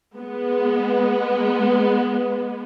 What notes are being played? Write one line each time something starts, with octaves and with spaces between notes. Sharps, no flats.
G#3 B3